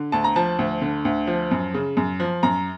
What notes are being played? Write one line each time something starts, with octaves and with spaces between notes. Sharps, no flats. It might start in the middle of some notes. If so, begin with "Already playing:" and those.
Already playing: D3
D2 A5
A#5
F3 A5
D2
D3
D2
F3
F#2
C#3
F#2
F3
F#2 A#5